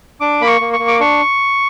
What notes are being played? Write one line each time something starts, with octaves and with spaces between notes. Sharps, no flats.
D4 D6
A#3 B5
C#6
A#3
C#6
A#3
D6
D4 C#6